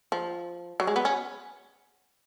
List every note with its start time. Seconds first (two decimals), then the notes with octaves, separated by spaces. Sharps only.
0.12 F3
0.80 F#3
0.87 G#3
0.96 B3
1.05 C#4